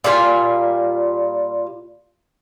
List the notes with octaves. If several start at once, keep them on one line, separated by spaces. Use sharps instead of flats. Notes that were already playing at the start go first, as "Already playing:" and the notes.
A#2 G3 F4 G#5